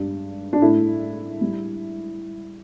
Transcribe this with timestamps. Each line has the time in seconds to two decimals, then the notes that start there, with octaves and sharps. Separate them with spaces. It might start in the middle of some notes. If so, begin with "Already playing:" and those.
Already playing: G2 G3
0.53 D4
0.61 A2 A3 E4
1.41 G3